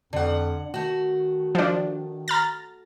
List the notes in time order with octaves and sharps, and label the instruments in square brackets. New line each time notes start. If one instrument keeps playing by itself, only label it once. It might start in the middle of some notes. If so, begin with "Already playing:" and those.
[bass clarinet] F2 [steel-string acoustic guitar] D3 F#5
[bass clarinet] D#3 [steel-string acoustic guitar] A3 F#4
[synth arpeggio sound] F3 D4
A#5 F6 A6